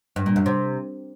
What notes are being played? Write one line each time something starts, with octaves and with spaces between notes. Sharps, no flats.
G2
A#2
F#2
C3